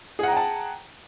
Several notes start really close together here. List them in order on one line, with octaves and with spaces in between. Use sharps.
G#4 F#5 A#5 G5 A5